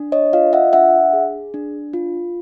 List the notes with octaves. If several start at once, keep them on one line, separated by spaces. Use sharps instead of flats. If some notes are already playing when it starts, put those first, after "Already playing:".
Already playing: D4
C#5 D#5
F4 D#5 F5
E5 F#5
D4 E5 F#5
G#4
D4
F4